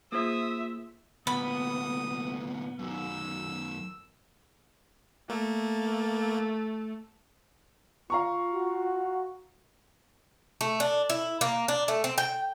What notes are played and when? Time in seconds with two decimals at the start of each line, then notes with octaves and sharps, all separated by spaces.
0.12 A#3 F4 G#4 C5 E5 D#6
1.27 D2 A#2 B3 B5 D#6
2.79 F#2 D#3 E6
5.29 A3 A#3
8.10 F4 F5 A#5 C#6
8.52 F#4
10.61 A3
10.80 D4
11.10 E4
11.41 A#3
11.68 D4
11.88 A3
12.04 C4
12.18 G5